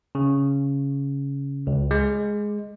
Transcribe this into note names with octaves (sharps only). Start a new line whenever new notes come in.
C#3
C#2
G#3